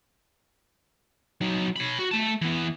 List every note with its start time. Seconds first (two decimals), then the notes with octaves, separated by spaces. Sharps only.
1.41 F#3 D#4
1.76 C#5 B5
1.99 F#4
2.11 A3 A5
2.42 E3 B3